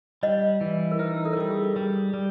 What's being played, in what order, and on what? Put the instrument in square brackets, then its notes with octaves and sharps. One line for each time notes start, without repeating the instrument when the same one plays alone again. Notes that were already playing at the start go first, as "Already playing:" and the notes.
[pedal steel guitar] G3 [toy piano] D#5
[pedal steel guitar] E3
[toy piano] A#4
[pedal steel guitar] D#4 [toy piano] B4
[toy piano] A4
A#4
[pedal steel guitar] G3 [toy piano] A4
[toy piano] G#4
A4
[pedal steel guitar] G3 [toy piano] G#4
[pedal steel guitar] G3